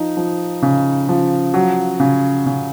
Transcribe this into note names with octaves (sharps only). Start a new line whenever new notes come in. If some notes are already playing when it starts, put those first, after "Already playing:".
Already playing: F3 D#4
F3
C#3
F3
F#3
C#3
C#3